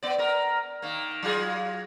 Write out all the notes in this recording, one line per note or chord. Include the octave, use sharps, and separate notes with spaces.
B3 D5
B3 A#4
D#3 A#3
F#3 F4 G#4